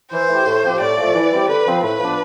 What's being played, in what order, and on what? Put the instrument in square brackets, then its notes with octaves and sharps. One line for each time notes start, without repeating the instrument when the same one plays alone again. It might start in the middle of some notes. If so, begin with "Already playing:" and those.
[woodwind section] E3 [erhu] C5
[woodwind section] A3 E4 G4
A2
F3 C4 G4
[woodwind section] A2 [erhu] D5
[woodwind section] F3 A3
E3
G3 C4 E4 G4
[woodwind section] D3 [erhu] B4
[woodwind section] F3 C4
[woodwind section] A2 [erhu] B4
[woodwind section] F3 B3 D4